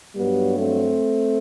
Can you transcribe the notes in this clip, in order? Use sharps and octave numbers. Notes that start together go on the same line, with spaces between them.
G2 F#3 G3 B3
A3 C4